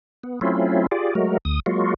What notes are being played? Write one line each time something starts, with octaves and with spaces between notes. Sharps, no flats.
B3
F#3 A3 C4 C#4 E4 F4
F4 G4 G#4 D5
F#3 G#3 A3 F#4 A#4
D2 D#6
F#3 G#3 A#3 F4 F#4